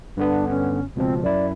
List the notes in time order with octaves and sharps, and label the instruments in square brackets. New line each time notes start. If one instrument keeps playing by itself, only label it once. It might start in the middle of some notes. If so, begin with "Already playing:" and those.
[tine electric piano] G2 D3 B3 [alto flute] D4
[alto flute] C#4
[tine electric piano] C#2 B2 F3 [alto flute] C4
[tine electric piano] F#2 E4 [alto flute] D5